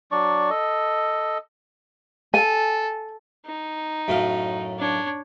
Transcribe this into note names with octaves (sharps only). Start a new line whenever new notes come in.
F#3 D4 D5 C#6
A4 D#5
A4 G#5
D#4
F#2 A2 F5
D4 C#5